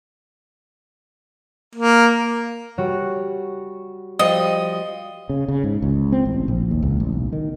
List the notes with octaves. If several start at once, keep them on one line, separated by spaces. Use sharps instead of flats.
A#3
G3 F#4 C#5
F3 G3 D#5
C#3
C#3
G#2
C#2
C4
A1
A#1
D#2
C#2
A1
B1
D#3